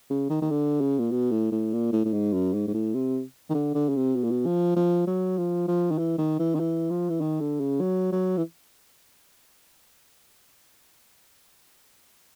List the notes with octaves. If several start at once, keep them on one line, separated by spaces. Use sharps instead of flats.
C#3
D#3
D#3
D3
C#3
A#2
B2
A2
A2
A#2
A2
A2
G#2
F#2
G#2
G#2
A2
C3
D#3
D3
D3
C#3
C3
B2
A#2
B2
F3
F3
F#3
F3
F3
D#3
E3
D#3
E3
D#3
E3
F3
E3
D#3
D3
C#3
F#3
F#3
E3